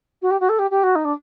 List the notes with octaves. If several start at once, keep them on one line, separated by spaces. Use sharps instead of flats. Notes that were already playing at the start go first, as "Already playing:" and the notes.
F#4
G4
F#4
A4
G4
G4
F#4
D#4
D4